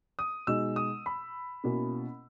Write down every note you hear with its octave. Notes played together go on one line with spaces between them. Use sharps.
D#6
B2 G#3 D#4 E6
D#6
B5
B2 A#3 C#4 E4